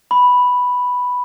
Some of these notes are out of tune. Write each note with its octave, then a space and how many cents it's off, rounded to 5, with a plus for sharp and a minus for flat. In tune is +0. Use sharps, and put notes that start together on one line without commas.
B5 +0